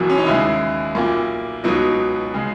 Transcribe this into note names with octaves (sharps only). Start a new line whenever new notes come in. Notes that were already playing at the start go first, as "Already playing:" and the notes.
Already playing: F#1 E2 B2 F#3 A#3
C#4
D#4
D#2 C#3 G#3 E4
B1 A#2 A#3
C#2 B2 F#3 D#4
C#3 G#3